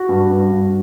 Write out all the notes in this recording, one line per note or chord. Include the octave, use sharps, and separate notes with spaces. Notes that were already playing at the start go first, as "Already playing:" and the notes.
Already playing: F#4
G2
G2
G2